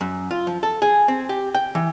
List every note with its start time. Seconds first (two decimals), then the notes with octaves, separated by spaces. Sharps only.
0.01 F#2
0.31 F4
0.47 F3
0.63 A4
0.82 G#4
1.08 C4
1.29 G4
1.55 G5
1.75 E3